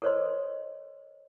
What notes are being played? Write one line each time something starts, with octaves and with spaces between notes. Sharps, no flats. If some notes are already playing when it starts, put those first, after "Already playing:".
A4 A#4 C5 C#5 D#5 C6